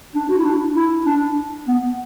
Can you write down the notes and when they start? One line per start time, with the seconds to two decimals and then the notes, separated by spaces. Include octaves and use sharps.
0.15 D4
0.29 F#4
0.38 E4
0.45 D4
0.76 E4
1.06 D4
1.68 B3